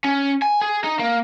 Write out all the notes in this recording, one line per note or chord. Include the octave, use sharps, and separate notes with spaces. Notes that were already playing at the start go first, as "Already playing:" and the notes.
C#4
G#5
G#4
D#4
A#3